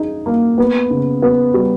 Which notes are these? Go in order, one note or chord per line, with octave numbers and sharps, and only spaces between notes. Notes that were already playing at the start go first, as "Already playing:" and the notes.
Already playing: D#4 G#4
A#3
B3
C#3
B3
G3